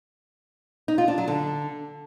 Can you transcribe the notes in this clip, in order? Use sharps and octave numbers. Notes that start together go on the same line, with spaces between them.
D#4
F4
D4
F#3
D3